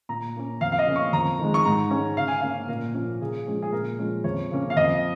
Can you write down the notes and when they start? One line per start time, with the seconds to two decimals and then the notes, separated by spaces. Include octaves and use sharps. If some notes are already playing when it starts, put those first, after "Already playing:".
0.09 A#2 A#5
0.36 A#3 C#4
0.61 F2 F5
0.72 F5
0.79 D#5
0.87 C#3 A#3 C#4
0.96 C#6
1.13 F2 A#5
1.39 D#3 G#3
1.54 C#6
1.65 G#2 A#5
1.91 G#3 C#4
2.17 C#3 F5
2.28 G#5
2.40 A#3 C#4 F5
2.68 A#2 A#4
2.94 F3 A#3 C#4
3.21 C#3 G#4
3.47 F3 G#3 C#4
3.62 G#4
3.72 A#2 A#4
3.99 F3 G#3 C#4
4.24 F2 C#5
4.51 C#3 A#3 C#4
4.70 F5
4.77 F2 D#5